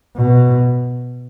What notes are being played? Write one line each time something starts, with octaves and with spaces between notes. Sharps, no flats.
B2